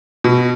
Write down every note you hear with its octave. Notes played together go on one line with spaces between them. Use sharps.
B2